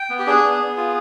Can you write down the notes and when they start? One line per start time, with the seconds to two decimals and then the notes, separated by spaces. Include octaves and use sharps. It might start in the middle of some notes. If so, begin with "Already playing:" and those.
Already playing: G5
0.10 B3
0.19 G4
0.27 D4 G#4
0.44 B3
0.60 B3
0.77 F4